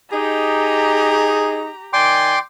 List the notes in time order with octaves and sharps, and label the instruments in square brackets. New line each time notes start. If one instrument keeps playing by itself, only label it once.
[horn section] D#4 [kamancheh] G4 A#5 [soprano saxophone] G#4
[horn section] D#3 D5 G#5 [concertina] G5 C6 D6